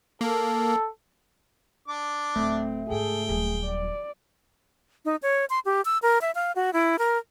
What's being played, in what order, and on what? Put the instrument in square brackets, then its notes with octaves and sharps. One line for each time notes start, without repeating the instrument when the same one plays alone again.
[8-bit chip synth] A#3 [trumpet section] A4
[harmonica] D4 D6
[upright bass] D1 [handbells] A3 [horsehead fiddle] C4
[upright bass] G#2 C#3 [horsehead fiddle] G#4 A4 [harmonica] G5
[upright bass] D#1 F#3 [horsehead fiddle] G#4
[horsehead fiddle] D5
[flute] D#4
C#5
C6
G4
E6
A#4
E5
F5
F#4
E4
A#4